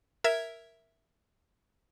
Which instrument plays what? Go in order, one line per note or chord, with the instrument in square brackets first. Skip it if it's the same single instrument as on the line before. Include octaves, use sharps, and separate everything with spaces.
[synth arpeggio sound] A#4 E5 G#6